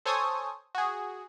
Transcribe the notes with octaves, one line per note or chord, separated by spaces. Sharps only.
A4 C5 C#5 G#5 C#6 D#6
F#4 G#4